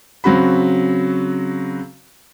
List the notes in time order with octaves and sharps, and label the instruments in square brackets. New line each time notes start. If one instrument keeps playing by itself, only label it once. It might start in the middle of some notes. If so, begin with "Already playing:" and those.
[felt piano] C#3 F#3 C4 F#4 B5